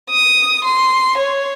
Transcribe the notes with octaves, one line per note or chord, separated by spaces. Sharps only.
D#6
C6
C#5